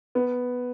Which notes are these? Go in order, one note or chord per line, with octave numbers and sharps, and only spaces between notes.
B3